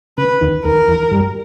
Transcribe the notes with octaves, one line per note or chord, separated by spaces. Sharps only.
C#3 B4
D#2 D#3
D#2 D#3 A#4
E2 E3
G2 G3